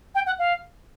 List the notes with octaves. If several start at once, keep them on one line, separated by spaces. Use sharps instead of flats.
G5
F#5
F5